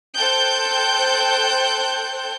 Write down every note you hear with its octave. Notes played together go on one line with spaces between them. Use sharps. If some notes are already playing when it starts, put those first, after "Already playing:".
A4 C5 G5 A5 F#6 G6